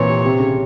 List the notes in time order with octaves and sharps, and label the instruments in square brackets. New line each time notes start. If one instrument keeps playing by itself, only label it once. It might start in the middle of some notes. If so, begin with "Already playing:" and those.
Already playing: [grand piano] A#2 E3 C4 [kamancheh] C#5
[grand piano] C3
C3
C#3